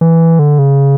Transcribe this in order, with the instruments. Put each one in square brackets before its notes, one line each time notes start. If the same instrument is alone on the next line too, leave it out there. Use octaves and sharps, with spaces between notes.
[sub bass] E3
D3
C#3